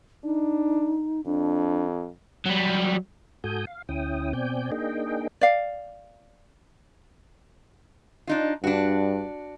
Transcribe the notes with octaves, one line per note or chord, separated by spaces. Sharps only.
D4 D#4
F2 D4
F#3 G3
G#2 F#4 A4 G#5 D#6 G6
F5
D2 C#4 E4 G5 D#6
B2 C4 D5 G5 G#5 G6
A#3 D4 D#4 G#4 D#5 G5
D5 F5
D4 D#4 F4
G2 D4 F#4